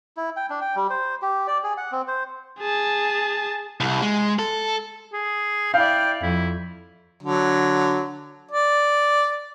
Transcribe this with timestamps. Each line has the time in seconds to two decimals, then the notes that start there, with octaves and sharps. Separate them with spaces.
0.17 E4
0.37 G5
0.50 D4
0.62 G5
0.76 G3
0.90 C5
1.22 G4
1.47 D5
1.64 G#4
1.77 F#5
1.92 C4
2.08 C5
2.60 G#4 A5
3.80 C2
4.02 G#3
4.39 A4
5.13 G#4
5.74 E4 D5 F5 G5
6.22 F2 E4
7.23 D3 F#3
8.51 D5